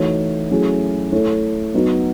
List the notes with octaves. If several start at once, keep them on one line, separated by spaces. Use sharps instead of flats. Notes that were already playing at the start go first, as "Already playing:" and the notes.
Already playing: E3 A3 D#4 F#4 C#5
F#3 A3 C#4 E4 G#4
A3 E4 A4 C#5
F#3 B3 D#4 F#4